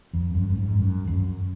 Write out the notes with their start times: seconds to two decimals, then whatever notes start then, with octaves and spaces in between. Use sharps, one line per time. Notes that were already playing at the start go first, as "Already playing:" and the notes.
0.13 F2
0.35 F#2
0.49 F#2
0.57 G#2
0.79 F#2
1.07 F2
1.13 F#2